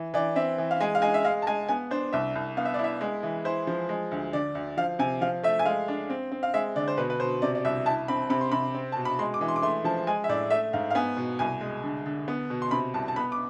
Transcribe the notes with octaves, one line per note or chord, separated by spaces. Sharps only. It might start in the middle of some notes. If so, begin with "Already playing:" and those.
Already playing: E3
E3 D5
C4 E5
E3
F5
G#3 G#5
F5
G#3 G#5
E5
G#3 F5
A5
G#3 G#5
B3 G#5
D4 C5
C2 E5
C2
B3 F5
E5
D5
E4
E5
G#3
E3
E4 C5
F3
G#3
D2
D3 D5
D2
F3 F5
C3 G#5
F3 F5
A3 E5
G#5
G#3 F5
D4
C4
C4
F5
G#3 E5
D3 D5
C5
B2 B4
B4
B2 C5
C3 D5
D5
C2 E5
E4 A5
C4 B5
C3 B5
C6
C3 B5
C4
B2 A5
B5
G#3 C6
D6
E3
C6
D6
A3 C6
F3 A5
G#3 G#5
E5
A2 D5
A3 E5
G#2 F5
F5
B3 G#5
B2
C2 G#5
G#3
D3
D3
B3
B2
C6
C3 B5
C2 A5
A5
B3 B5
D6